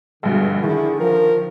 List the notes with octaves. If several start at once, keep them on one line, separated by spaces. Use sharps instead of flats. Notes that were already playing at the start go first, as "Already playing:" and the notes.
A#1 G2 B2 D3 G#3
D#3 E4 G#4
F3 A#4